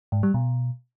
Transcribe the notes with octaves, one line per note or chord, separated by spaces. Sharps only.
G#2
G3
B2